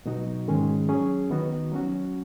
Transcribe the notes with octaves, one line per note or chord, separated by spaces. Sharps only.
B2 F#3 D#4 F#4
G#2 D#3 G#3 C#4 G#4
F#3 C#4 G#4
D#3 B3 D#4 F#4
F#3 C#4 F#4